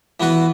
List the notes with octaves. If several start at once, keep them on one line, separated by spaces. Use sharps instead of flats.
E3 B3 F#4 B4